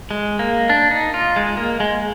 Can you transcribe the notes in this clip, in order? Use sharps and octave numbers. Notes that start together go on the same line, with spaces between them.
G#3
A#3
D4
D#4
F4
G#3
A#3
G#3